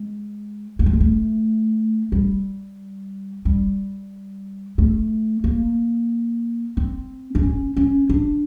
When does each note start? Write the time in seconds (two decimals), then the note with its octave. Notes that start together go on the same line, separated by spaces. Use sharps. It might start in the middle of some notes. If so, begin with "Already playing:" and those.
Already playing: G#3
0.79 A#3
0.86 A3
0.93 G#3
1.00 A3
2.12 G3
3.45 G3
4.78 A3
5.44 A#3
6.77 C4
7.35 D4
7.43 C#4
7.76 C#4
8.09 D4